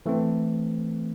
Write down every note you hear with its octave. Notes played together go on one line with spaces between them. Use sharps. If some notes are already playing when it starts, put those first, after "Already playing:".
E3 A3 C4